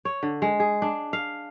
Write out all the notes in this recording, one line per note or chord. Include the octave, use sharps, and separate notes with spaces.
C#5
D3
G#3
G#4
D4
F5